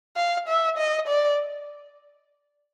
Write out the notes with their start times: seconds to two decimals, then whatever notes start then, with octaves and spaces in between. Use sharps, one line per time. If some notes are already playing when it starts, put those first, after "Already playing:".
0.17 F5
0.48 E5
0.78 D#5
1.07 D5